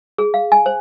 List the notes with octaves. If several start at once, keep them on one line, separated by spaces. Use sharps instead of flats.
G#4
F5
G#5
C5